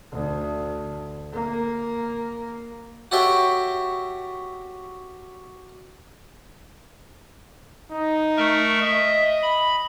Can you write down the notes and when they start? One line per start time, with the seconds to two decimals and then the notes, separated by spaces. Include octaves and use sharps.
0.12 D2
1.33 A#3
3.11 F#4 G4 A4 C#5 E5 G5
7.91 D#4
8.37 A3 A#4 C#6
8.82 D#5 E5
9.43 B5